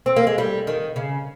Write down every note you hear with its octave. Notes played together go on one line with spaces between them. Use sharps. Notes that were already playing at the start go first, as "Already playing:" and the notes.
C4
A#3
G#3
G3
D#3
C#3